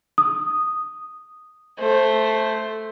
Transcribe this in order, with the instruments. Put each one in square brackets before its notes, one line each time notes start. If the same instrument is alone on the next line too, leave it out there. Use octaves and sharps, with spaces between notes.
[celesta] D#6
[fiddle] A3 C5